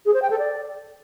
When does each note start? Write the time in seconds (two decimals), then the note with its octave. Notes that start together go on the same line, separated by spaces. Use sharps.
0.06 G#4
0.14 C5
0.22 G5
0.30 A4
0.39 D5